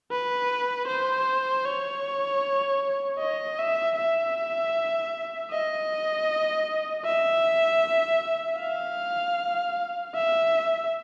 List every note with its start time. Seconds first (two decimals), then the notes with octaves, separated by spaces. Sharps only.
0.11 B4
0.88 C5
1.65 C#5
3.19 D#5
3.59 E5
3.96 E5
5.51 D#5
7.05 E5
8.59 F5
10.15 E5